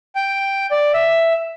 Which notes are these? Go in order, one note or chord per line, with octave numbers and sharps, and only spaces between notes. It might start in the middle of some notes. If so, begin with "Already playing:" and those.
G5
D5
E5